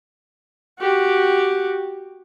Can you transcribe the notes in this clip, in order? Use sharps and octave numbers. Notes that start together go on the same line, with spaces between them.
F#4 G4